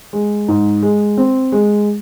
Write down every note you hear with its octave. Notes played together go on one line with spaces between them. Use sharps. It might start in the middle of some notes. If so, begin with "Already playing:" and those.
G#3
G#2
G#3
C4
G#3